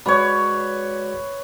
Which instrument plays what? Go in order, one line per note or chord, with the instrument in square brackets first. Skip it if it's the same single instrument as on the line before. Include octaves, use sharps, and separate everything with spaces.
[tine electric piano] G#3 F#4 D5 [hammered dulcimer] B4 C#5